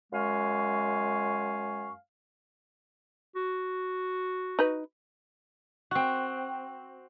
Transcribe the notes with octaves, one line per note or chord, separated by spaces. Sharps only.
F#2 G#3 F5 G#5 C#6
F#4
D#4 B4
C4 F#4